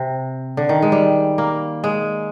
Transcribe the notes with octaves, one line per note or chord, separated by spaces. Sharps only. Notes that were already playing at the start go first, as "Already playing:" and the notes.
Already playing: C3
D3
D#3
G#3
G3
A#3
G#3